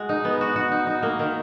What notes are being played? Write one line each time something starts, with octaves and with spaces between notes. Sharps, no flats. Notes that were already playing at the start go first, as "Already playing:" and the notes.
Already playing: G#3 F#4
D#4
B3
F#4
F#4
D#4
D#4
A#3
D#3